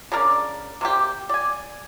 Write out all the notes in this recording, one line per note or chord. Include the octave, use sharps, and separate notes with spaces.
C#3 D4 A#4 D5
C3 A#3 G4
D5 G#5